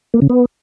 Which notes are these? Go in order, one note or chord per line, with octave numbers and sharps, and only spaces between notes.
A#3
C#3
B3